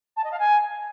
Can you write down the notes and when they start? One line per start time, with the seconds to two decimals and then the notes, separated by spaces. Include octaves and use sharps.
0.16 A5
0.24 D#5
0.31 F5
0.39 G#5